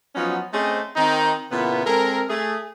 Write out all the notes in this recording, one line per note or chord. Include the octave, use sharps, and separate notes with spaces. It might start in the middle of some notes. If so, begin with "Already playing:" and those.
F3 F#3 B3 C#4 D#4 F4
A3 C4 C#4 G#4 C5 D#5
D#3 C4 D#4
A#2 C#3 E3 B3
G#3 C4 A4 A#4
A3 G#4